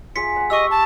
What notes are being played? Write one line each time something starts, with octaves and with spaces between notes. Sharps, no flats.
F4 G#4 E5 B6 C#7
F#5 G#5
G4 D#5 C#6 E6
A5